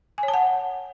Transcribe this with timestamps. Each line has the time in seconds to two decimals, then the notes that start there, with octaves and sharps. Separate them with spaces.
0.18 G#5
0.23 C#5
0.28 A5
0.34 F#5